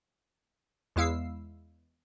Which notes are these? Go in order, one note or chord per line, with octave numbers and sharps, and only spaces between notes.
E2 G#3 E4 F5 E6 C7